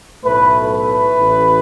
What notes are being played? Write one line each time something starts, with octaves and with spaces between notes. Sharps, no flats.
B1 A2 A3 B4
B4
A1 A2 A3